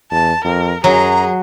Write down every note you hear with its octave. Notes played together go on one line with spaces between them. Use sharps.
E2 A5
F2 A#4
F#2 F#3 G#4 A#5